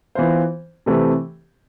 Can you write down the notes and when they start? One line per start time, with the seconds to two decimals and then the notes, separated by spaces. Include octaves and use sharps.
0.15 E3 B3 F4 C5
0.86 C3 E3 A3 C4 G4